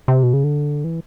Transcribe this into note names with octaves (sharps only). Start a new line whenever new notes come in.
C3
B2
C#3
D3
E3